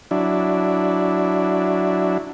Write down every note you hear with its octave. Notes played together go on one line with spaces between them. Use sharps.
F#3 D4 E4